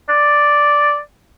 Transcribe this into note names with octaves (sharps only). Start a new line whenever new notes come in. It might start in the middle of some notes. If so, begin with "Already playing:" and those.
D5